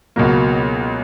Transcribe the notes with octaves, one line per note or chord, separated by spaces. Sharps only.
C#2 B2 F#3 A#3